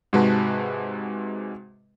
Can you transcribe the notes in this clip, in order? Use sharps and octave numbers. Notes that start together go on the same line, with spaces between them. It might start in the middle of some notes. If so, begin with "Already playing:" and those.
G#2 C3 G#3 F#4 B4 A5